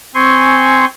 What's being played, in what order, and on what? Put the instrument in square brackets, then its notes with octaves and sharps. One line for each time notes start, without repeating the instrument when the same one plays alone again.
[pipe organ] C4 G#5 C6 C#6